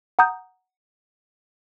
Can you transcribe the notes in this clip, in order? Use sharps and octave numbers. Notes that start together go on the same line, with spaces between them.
F#5 A#5 D#6 G6